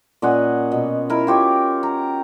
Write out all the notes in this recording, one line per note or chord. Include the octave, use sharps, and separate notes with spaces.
A#2 C#4 D#5 F#5
B2
E4 A#4
F4 G4 C#5
A#5